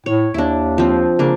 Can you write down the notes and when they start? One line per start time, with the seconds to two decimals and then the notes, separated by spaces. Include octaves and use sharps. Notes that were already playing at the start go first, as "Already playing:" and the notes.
0.06 A2 C#5
0.34 D#2 D4 E4
0.78 F3 C4
1.19 C#3 A#3 D4